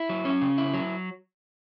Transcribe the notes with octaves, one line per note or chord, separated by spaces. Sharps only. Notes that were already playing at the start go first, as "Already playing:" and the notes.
Already playing: E4
F#3
C#4
C#3
E4
F#3